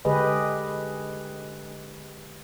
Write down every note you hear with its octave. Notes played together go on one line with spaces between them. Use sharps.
D3 G#3 G4 G#4 B4 D#5